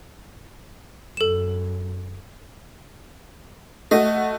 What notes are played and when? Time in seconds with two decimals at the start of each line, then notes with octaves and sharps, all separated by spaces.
1.17 F#2 A4 E7
3.91 A3 F#4 D#5